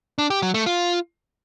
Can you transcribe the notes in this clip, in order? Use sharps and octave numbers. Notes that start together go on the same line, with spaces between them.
D4
G4
F#3
A3
F4